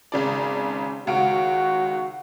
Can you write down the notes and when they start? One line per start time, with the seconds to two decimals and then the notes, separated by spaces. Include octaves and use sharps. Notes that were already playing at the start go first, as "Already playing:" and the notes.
0.12 G#1 C#3 D5
1.07 C#2 D#3 F#4 F5 D7